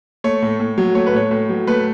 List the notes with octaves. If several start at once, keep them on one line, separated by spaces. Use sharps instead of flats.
A3 C#5
A2
A2
F#3
A3 C#5
B4
A2 C#5
A2
F#3
A3 B4